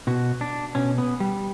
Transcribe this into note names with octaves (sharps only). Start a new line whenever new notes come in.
B2 F#4
D4
B2 C#4
B3
G3